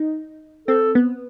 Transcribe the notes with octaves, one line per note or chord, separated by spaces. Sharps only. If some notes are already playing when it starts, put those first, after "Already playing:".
Already playing: D#4
C4 A4
B3